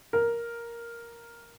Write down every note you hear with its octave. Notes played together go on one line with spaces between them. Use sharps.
A#4